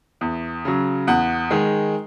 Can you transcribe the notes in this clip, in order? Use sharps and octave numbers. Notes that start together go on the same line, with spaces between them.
E2
C#3 F#3
E2 F#5
D#3 G#3